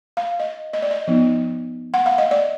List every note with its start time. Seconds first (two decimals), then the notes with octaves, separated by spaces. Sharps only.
0.17 F5
0.40 D#5
0.73 D#5
0.82 D5
0.91 D#5
1.08 F3 B3 D#4
1.94 F#5
2.06 F5
2.18 D#5
2.31 D5